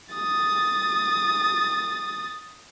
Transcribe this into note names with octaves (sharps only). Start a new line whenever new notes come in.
D#6 A6